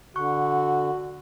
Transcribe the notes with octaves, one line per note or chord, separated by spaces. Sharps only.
D3 F#4 C#6 F#6